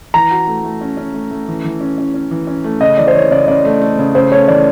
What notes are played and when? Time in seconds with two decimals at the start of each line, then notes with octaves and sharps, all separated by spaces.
0.14 E3 A#5
0.31 F#4
0.47 A3
0.64 A3
0.81 C#4
0.97 C#4
1.14 A3
1.31 A3
1.48 E3
1.64 E3
1.81 C#4
1.98 C#4
2.14 C#4
2.31 E3
2.47 C#4
2.64 A3
2.81 C#3 D#5
2.98 E3 D5
3.07 C5
3.15 E3 C#5
3.31 C#3 D5
3.48 C#3 D5
3.65 A3
3.82 A3
3.98 C#3
4.15 C#3 C5
4.32 A3 C#5
4.48 E3 D5